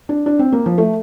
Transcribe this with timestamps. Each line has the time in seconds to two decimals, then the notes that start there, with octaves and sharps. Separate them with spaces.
0.09 D4
0.26 D4
0.39 C4
0.52 A#3
0.66 F3
0.78 A3